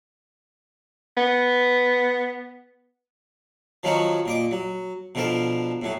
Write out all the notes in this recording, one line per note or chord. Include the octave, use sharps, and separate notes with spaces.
B3
D#3 F3 F#3 C#4 D#4 C#5
A#2 D#5 D6
F#3
B2 D3 F3 A#4 A5
A2 F#3